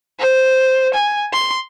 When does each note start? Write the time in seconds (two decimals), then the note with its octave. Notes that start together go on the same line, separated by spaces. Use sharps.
0.19 C5
0.94 G#5
1.33 C6